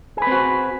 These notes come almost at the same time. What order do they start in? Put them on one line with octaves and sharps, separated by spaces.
G#4 B4 C4 F#4